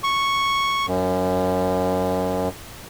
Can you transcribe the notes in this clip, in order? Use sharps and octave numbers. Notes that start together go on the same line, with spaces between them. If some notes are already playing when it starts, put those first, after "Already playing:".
C#6
F#2